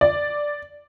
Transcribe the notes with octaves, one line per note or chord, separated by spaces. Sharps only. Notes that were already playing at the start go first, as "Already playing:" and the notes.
D5